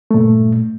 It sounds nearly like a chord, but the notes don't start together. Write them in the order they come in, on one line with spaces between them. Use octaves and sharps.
A3 A#2 G2